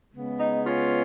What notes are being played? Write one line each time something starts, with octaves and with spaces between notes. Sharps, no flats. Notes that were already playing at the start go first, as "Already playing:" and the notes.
C#3 G#3 B3
D#4
C#4 F4